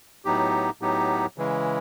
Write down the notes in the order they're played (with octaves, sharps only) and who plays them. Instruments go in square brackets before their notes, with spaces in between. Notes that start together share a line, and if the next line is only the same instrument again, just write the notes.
[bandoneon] A2 F#3 B3 D#4 G4
A2 F#3 B3 D#4 G4
C#3 E3 G#3